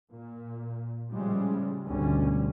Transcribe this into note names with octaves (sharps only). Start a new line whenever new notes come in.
A#2
A2 C#3 F3 G3 G#3
G#1 D2 B2 G3 C#4